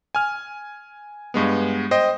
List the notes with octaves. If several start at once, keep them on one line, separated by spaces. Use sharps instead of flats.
G#5 F6
G2 G#3 B3
C5 D#5 G5